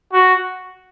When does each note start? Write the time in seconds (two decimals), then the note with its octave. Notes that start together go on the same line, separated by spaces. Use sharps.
0.13 F#4